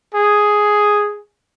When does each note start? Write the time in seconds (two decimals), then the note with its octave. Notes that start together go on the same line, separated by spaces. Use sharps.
0.15 G#4